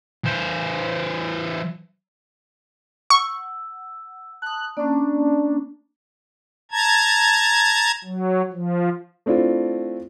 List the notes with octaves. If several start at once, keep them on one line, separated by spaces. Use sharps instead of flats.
E3 C5
F#5 C#6 E6
A5 D#6 F#6
A#3 C#4 D4
A5 A#5 G#6
F#3
F3
A3 C4 D4 E4 F4